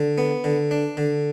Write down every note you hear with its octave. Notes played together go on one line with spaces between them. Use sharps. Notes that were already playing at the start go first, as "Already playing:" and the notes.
Already playing: D3
B3
D3
D4
D3